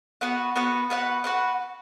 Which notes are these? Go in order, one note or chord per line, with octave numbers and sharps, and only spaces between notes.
B3 F#4 B4 F#5
B3 F#4 B4 F#5
B3 F#4 B4 F#5
F#4 B4 F#5